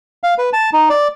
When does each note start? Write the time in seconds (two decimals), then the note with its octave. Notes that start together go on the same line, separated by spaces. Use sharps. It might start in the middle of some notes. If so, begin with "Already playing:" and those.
0.24 F5
0.38 B4
0.53 A5
0.73 D#4
0.90 D5